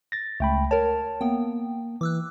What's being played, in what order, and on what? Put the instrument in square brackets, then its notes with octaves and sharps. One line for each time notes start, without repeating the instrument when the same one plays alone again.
[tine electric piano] A6 A#6
[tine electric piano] C#2 G5 B5 [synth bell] A3
[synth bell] A#4 C#5 [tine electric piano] A5
[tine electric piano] A#3 [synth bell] B3 G5
[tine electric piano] E3 [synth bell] D6 E6 F#6